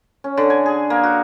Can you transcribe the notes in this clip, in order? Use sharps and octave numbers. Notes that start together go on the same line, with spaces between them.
C#4
D3
G#5
G#4
A#3
F#4